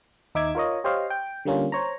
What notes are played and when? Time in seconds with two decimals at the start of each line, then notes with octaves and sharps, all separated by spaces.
0.35 D#2 D#4 E5 D6 E6 G#6
0.55 F4 A#4 C#5 D#5
0.84 G4 C5 C#5 D#5 F5
1.10 G5
1.45 D3 G3 A#3 C#4 F4
1.72 C5 C#5 A#5